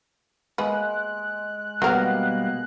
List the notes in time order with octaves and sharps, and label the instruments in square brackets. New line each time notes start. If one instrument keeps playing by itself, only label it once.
[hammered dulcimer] G#3 [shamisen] A#3 B3 B4 [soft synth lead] F#6
[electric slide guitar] B2 G3 A#3 [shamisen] F#3 G4 A#4 [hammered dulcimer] B3 F#5